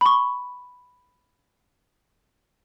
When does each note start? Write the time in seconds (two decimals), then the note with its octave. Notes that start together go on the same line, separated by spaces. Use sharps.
0.01 B5 C#6